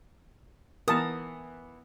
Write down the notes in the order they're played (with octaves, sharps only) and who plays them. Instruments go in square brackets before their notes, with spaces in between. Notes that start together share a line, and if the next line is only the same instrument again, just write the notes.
[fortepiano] E3 B3 [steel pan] A#4 A5 [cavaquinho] D#6